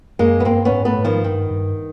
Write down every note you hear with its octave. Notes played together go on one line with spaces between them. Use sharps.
F#2 G#3 A#3
B3
G2 A#3 C4
B3 C#4
G#2
A3 B3
G#2
D#3 F3
G2 D#3
G2